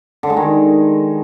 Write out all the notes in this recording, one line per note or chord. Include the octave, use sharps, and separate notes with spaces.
D3
G#3
D#3